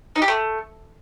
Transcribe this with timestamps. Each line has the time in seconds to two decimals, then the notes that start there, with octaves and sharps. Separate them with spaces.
0.16 D#4
0.22 G4
0.28 A3